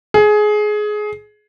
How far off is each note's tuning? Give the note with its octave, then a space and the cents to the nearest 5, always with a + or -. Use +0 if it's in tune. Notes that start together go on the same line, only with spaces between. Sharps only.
G#4 +20